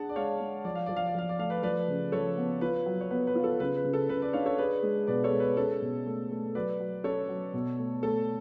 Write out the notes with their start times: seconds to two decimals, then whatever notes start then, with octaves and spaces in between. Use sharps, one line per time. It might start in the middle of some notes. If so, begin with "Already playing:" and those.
Already playing: D4 G#4 F#5 A5
0.09 D5
0.16 G#3 C#5 F5
0.40 G#3
0.64 F3 D5
0.75 F5
0.86 F3 D5
0.96 F5
1.07 D5
1.15 F3 F5
1.29 D5
1.39 A3 F5
1.50 B4 D5
1.63 F3 B4 D5
1.88 C#3
2.12 F3 A4 C#5
2.37 B3
2.61 F4 B4
2.86 F#3
3.01 C#5
3.11 B3 B4
3.27 B4
3.35 F4
3.44 A4
3.60 C#3 B4
3.76 B4
3.84 C#3
3.93 A4
4.09 C#3 B4
4.22 B4 D5
4.33 D4 C#5 F5
4.46 A4 C#5
4.58 G#4 B4 D5
4.83 G#3
5.07 B2 B4 D5
5.24 A4 C#5
5.32 G#3
5.40 B4
5.57 C#4 A4
5.82 B2
6.06 A3
6.31 A3
6.55 F#3 B4 D5
6.80 F#3
7.04 C#4 A4 C#5
7.29 F#3
7.53 B2
7.79 A3
8.03 A3 A4